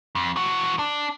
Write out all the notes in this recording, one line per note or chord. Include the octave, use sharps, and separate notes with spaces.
F2
E3 F#4
D4